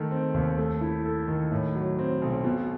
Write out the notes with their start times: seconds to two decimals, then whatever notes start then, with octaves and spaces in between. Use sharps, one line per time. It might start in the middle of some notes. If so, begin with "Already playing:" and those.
Already playing: D#3 A3
0.11 C4
0.34 D#2
0.58 A3
0.81 E4
1.05 A4
1.28 D#3
1.52 A2
1.75 F#3
1.98 C4
2.22 B1
2.44 B2